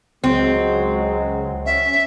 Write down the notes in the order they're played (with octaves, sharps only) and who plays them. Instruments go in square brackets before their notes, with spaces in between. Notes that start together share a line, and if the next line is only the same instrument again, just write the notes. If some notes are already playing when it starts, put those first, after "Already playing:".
[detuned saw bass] C#2 [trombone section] F#3 G#3 [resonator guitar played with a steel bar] C4
[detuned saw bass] C#4 [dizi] E5